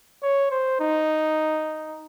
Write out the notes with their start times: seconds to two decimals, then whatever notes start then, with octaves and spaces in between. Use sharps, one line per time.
0.23 C#5
0.51 C5
0.80 D#4